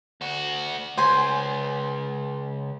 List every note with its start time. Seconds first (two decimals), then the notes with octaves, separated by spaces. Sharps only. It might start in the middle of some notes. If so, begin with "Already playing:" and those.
0.21 D2 F#4
0.97 C#2 C5 G#5 C6